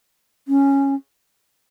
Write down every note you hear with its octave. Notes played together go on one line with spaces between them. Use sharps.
C#4